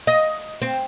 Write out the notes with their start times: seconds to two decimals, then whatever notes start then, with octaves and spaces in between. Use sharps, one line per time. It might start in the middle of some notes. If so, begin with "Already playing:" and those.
0.07 D#5
0.62 C4